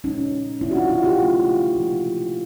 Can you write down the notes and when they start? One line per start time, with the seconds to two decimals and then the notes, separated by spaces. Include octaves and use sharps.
0.04 A#2 F3 G#3 C#4 D#4
0.61 B2 G#3 D4 E4
0.71 F#4
0.75 D#4 F4
0.90 E4 F#4
1.04 F4 G4
1.19 C#3 F3 A3
1.75 C3 F3 A#3